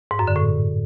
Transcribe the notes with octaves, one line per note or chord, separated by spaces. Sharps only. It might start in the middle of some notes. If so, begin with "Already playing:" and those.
G#2
F#2
D3
A2